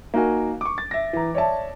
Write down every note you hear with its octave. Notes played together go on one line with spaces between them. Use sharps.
A#3 D#4 F#4 A#4 G#5
C#6 D6
A6
E5 A#6
E3 A#5
C#5 D5 E5 A5